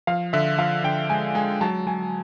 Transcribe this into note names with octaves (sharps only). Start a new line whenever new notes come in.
F3 F5
D3 E5
F3 F5
D3 G5
G#3 G#5
G#3 G#5
F#3 A5
F#3 G#5